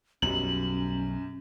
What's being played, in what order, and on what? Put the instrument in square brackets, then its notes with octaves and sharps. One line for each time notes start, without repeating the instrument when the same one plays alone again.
[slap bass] B1 [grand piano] F#2 G3 [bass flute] C#4 [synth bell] F#7